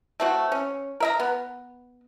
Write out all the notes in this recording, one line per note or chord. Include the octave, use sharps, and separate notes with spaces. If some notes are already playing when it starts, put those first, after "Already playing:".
A3 C4 F#4
C#4
A#4 E5 A#5
B3